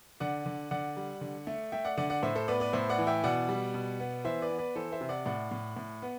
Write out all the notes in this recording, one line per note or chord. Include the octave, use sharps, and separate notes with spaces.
D3 D5 F#5
D3
D3 D5 F#5
G3
D3
A3
A3 E5 G5
D5 F#5
D3 D5 F#5
D5 F#5
A2 C5 E5
A4 C5
B3 B4 D5
B4 D5
A2 C5 E5
D5 F#5
E3
E5 G5
B2 D5 F#5
G3
B2
B3
E3 C5 E5
B4 D5
B3
B4 D5
E3 A4 C5
C5 E5
C3
D5 F#5
A2 D5 F#5
A2
A2
B3